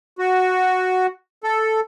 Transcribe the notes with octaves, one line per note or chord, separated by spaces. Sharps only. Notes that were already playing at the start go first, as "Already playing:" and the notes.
F#4
A4